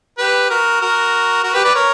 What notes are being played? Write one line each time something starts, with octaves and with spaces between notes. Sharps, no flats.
G4 B4
F#4 A#4
F#4 A#4
F#4 A#4
G4 B4
B4 D5
A#4 C#5